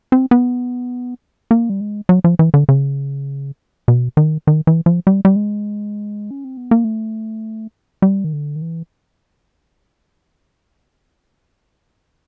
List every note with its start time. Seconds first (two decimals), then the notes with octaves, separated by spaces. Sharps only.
0.12 C4
0.31 B3
1.51 A#3
1.70 G3
1.81 G#3
2.09 F#3
2.24 F3
2.39 E3
2.54 D3
2.69 C#3
3.88 B2
4.17 D#3
4.47 D#3
4.67 E3
4.86 F3
5.07 G3
5.25 G3
5.36 G#3
6.31 C#4
6.44 C4
6.57 B3
6.71 A#3
6.84 A3
8.02 G3
8.24 D#3
8.33 D3
8.56 D#3
8.62 E3